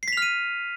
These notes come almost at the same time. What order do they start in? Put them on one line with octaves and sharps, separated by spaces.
C7 B6 F7 F6 D#7